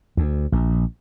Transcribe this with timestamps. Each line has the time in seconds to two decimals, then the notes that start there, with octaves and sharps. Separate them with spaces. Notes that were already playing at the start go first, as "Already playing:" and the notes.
0.17 D2
0.52 A#1